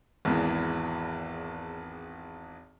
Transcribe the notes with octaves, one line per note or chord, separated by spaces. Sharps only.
G#1 E2 E3